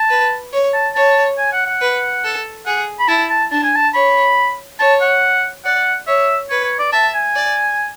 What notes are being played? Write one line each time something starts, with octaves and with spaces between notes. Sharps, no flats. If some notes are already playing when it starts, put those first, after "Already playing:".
Already playing: A5
B4
C#5
A5
C#5 A5
G#5
F#5
F#5
B4
A4
G#4 F#5
B5
E4 A5
A5
D4 A5
G#5
A5
C#5 B5
C#5 A5
F#5
D5 F#5
C#5 E5
B4 C#5
C#5
D5
E5 A5
G#5
D5